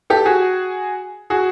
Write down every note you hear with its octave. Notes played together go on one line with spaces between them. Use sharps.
G4 A4
F#4 G#4
F#4 G#4